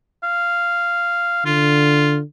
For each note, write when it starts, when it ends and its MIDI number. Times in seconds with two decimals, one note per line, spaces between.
0.24 1.44 77
1.46 2.22 50
1.46 2.17 65